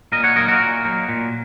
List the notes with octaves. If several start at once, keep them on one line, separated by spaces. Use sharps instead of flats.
A#2 A#4 D#5
C#5 F#5
F#3 A#3 D#4 A#4 D#5
F#4 A#4
A#2
F#3 A#3 D#4
A#2